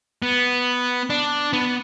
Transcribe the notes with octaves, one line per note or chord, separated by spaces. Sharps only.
B3
D4
B3